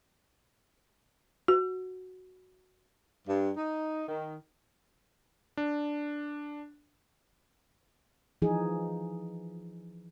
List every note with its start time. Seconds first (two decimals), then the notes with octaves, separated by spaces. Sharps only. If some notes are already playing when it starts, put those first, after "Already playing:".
1.48 F#4
3.28 G2
3.57 D#4
4.09 D#3
5.57 D4
8.42 E3 F3 D#4 G#4